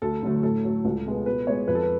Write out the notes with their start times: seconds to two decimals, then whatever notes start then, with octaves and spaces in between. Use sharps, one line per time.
0.02 D2 A4
0.22 D3 F#3 A3
0.43 A2 A4
0.64 F#3 A3
0.85 C#2
1.05 B2 G#3 B3
1.26 B2 B4
1.47 G#3 B3 C#5
1.68 F2 B4
1.75 A4
1.83 B4